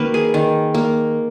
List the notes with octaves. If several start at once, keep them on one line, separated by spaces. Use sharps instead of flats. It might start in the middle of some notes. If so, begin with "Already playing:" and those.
Already playing: D#3 A#3 F#4 B4
G#4
D#3
A#3